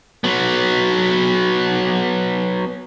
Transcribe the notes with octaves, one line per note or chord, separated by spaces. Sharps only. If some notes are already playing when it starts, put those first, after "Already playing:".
F#3 B3